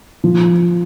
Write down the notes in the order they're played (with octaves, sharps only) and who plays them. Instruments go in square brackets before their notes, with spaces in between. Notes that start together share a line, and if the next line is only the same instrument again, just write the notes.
[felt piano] F3